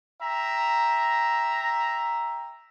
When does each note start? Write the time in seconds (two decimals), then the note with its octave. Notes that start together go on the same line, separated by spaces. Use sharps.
0.22 E5 G5 A#5